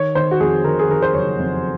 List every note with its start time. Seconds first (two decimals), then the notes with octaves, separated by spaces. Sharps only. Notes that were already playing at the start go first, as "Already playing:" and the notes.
Already playing: D#3 C#5
0.15 D#3 C5
0.31 F#4
0.40 F2 G#4
0.64 D#3 A#4
0.79 G#4
0.89 D#3 A#4
1.02 C5
1.13 F#1 C#5
1.39 F2